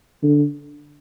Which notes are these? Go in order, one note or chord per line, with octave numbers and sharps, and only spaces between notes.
D3